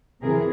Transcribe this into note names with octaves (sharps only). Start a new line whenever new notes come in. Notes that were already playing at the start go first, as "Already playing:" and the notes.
C3 E3 G#4 A#4